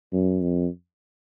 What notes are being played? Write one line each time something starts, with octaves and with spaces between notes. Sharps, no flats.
F#2
F2